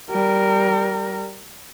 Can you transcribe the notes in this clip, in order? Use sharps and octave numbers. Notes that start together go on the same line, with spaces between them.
G3 A#4